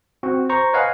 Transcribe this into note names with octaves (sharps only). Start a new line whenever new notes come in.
C4 F#4
C5 A#5 C#6
B4 C#5 D#5 F5 F#5 G#5